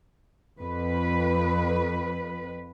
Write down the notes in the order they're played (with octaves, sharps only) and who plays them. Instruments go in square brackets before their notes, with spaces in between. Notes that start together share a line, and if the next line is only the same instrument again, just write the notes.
[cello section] F2 B4